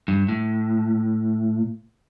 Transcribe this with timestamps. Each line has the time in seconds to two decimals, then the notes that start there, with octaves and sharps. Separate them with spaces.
0.08 G2
0.29 A2